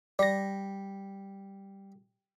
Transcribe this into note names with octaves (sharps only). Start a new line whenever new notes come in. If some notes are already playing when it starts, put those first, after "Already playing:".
G3 D5 A#6